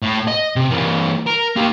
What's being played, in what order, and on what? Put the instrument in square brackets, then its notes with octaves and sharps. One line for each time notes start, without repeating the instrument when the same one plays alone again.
[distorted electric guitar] A2
D#5
C3
E3 A#3
A#4
A#3 G4